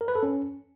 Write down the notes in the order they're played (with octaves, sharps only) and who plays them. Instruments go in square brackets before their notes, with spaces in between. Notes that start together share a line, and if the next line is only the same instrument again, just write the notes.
[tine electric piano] A#4
B4
A4
C#4